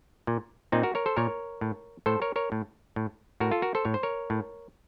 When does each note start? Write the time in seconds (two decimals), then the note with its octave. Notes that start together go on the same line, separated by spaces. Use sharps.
0.27 A#2
0.72 A#2 C4 D#4
0.83 F#4 A#4
0.95 A#4 C#5
1.06 A4 C5
1.16 A#2 A#4 C#5
1.61 A2
2.06 A2 A4 C5
2.22 A#4 C#5
2.36 A#4 C#5
2.52 A2
2.96 A2
3.40 A2 F#4 A#4
3.51 F4 A4
3.62 F#4 A#4
3.75 A4 C5
3.85 A2 C#5
3.94 C5
4.03 A#4 C#5
4.30 A2